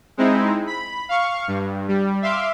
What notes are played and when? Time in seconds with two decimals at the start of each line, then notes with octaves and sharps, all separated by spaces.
0.17 G#3 C4 D#4 E4
0.67 B5
1.09 F5 C#6
1.48 G2
1.88 G3
2.22 E5 F5 C6 D6